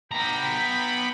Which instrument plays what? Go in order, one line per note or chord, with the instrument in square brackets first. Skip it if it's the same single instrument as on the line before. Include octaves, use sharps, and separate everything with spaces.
[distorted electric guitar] B3 A#5 [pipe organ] G5 B5